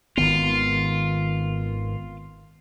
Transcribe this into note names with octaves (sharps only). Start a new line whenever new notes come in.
G#1 D#3 B3 F4